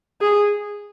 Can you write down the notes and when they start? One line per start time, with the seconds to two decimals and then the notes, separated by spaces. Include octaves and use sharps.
0.21 G#4